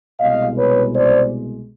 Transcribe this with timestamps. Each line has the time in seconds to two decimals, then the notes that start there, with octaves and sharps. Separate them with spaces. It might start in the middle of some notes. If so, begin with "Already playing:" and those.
0.19 C2 B2 G#3 D#5 F5
0.56 B4 C#5
0.93 C5 D5